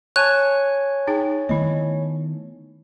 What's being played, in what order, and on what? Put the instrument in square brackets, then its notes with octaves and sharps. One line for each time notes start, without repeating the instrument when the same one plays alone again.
[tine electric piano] C#5 G#5 A5 [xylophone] F#6
[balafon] D#4 G#4 G5
[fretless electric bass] D#3 A3 B3 [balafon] E4 D#5